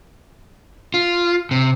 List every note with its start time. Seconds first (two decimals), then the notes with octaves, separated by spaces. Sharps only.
0.94 F4
1.51 C3